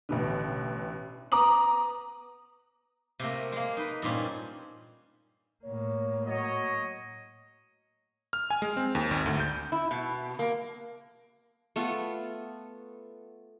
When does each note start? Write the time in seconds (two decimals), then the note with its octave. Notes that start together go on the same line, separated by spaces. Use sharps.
0.09 A1 B2 D3
1.32 B3 A#5 D6 D#6 F#7
3.19 C3 A3 A#3 A#4
3.52 G#3 A#3
3.77 D#4 B4
4.02 G2 A#2 C4 C#4
5.64 A2 A#3 C#5
6.27 F#3 C#5 D#5
8.33 F6
8.50 G#5
8.62 G#3
8.77 C4
8.95 D#2
9.11 G#1
9.26 D2
9.40 G6
9.72 E4
9.91 B2
10.39 A#3
11.76 A3 B3 F4 A4